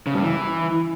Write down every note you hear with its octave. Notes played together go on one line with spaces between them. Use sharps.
C#3
G2
E3